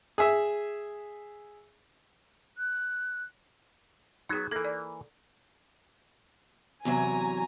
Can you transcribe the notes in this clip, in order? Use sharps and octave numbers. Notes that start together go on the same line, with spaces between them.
G#4 E5
F#6
F#3 B3 D#4 G#4
E3 A#3 A4
D5
E2 C3 F#3 G#5 A#5